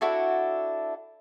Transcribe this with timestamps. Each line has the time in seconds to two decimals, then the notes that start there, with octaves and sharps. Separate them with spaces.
0.01 D4 E4 F#4 A4